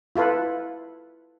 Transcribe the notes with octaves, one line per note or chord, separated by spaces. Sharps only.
E4 F4 A4 B4